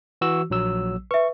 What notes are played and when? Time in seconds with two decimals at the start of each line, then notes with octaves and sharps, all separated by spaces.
0.21 E3 F#4 E6
0.50 A#1 F#3 E6
1.11 B4 E5 C#6